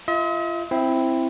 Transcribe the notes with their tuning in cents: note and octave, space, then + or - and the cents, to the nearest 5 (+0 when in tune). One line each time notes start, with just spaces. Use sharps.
F4 -30 D#5 +45
C4 +5 E4 +5